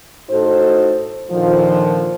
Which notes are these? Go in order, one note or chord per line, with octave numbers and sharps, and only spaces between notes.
A2 D#4 F#4 A4 C5
A#2 D3 D#3 F3